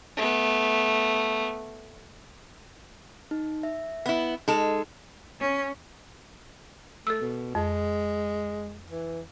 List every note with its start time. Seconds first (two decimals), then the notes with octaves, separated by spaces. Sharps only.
0.16 A3 B3
3.31 D#4
3.63 E5
4.06 B3 E4
4.48 G#3 D#4 A4
5.40 C#4
7.07 A3 A4 E6
7.21 B2
7.55 F2 G#3
8.90 E3